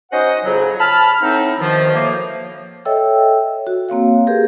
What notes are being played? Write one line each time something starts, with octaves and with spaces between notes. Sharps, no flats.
C#4 D#4 F#4 C5 D#5 F#5
F2 G#2 C#3 F#3
A5 B5 F6
A2 B3 C4 D#4
B2 D#3 F3
A2 F3 A#3
A4 C#5 D#5 E5 G5 E6
F#4
A#3 C4 C#5 F5
G4 G#4 A#4 B4